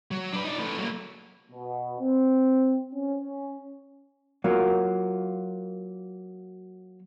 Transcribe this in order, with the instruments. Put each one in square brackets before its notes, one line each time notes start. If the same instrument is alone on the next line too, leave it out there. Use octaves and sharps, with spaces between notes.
[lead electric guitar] F#3
D4 B4
D#4 D5
A3 B4
F#3 A#3
[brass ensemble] B2
C4
C#4
[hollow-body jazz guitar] F#3 A#3 F4